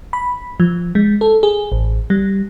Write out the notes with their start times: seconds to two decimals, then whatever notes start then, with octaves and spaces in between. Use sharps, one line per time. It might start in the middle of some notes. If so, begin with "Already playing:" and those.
0.13 B5
0.60 F3
0.95 G#3
1.21 A4
1.43 G#4
1.72 A1
2.10 G3